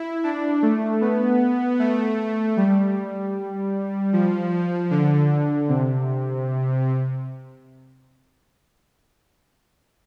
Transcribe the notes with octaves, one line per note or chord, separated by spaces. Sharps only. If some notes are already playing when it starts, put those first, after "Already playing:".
Already playing: E4
D4
A3
B3
A3
G3
F3
D3
C3